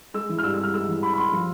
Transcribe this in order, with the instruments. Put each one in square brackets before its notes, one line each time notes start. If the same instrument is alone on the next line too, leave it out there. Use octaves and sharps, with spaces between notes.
[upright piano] G#3 E6
E3
F6
G2 E6
E6
G2 F6
G#3 E6
E3
G2 B5
B5
G2 C6
F3